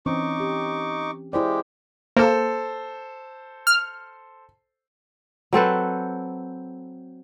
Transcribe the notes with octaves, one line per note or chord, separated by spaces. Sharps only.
E3 C4 C#4 D#4 C#6 D6
G4
G#3 E4 G4 C5 D5
A#3 A4 C5
F6
F#3 C4 A4 B4